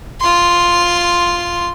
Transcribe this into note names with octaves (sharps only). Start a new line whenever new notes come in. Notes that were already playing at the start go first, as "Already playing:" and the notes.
F4 C6